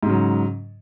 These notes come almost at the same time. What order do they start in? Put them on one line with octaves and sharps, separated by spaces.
G#2 C#3 F#3